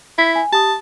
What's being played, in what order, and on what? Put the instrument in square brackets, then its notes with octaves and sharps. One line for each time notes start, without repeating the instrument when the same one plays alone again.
[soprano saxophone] E4 [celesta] B6
[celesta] G#5
[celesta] G4 D#6 [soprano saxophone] A5